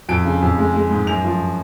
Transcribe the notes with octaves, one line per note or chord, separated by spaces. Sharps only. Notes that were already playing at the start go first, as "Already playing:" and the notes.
F2 D7
C#3
F2
G#3
G#3
G#2
F#2 F7
F3